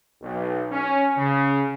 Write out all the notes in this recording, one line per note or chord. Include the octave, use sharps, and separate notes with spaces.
B1
C#4
C#3